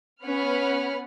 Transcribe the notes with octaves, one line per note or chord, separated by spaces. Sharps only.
B3 C#4 B4 F#5 B5 F6